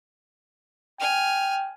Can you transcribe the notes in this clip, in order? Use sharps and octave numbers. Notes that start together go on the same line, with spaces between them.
G5 G#5 F6